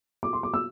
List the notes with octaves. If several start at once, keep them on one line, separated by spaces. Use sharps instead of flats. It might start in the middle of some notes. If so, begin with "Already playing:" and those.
D6
C6
D6
E6